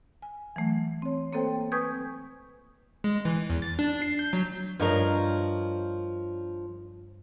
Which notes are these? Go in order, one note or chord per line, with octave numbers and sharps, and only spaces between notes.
G#5
E3 F#3 A3
C4 C#5
A#3 C4 A4 C5 G5
B4 G#5 C#6 D#6 G6 G#6
G#3
E3
E2
A6
D4
C7
G6
F#3
G2 F3 D4 A#4 C#5 D#5